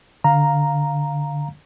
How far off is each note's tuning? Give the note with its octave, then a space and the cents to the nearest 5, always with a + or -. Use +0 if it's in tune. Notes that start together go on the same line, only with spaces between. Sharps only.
D3 +0 F5 +5 A#5 +0